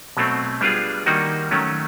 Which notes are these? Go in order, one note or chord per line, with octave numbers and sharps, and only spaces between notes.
B2 F#3 A3 C4
G3 B3 D4 F4 G#4
D#3 G3 A#3 D#4 F#4
D#3 F#3 A3 C#4